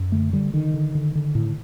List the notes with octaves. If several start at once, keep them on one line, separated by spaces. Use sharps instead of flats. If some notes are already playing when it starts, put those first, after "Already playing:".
Already playing: F#2
D3 A3
D3 G3
D3 D#3
D3
D3
D3
A2